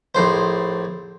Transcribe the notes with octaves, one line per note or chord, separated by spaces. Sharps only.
A#1 A2 C5